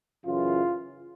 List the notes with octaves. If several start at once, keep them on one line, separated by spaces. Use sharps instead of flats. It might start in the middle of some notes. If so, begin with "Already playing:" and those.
F#2 C#3 E3 F4